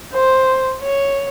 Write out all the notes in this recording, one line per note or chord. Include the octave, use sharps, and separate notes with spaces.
C5
C#5